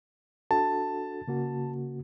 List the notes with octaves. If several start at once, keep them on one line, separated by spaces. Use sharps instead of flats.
D4 F#4 A4 A5
C#3 A#3 F#4